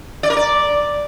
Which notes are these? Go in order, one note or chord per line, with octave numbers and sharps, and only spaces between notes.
D5
A#4
D5